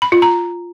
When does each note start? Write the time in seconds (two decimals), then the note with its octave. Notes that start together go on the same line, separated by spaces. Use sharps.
0.02 B5
0.12 F4
0.22 A#5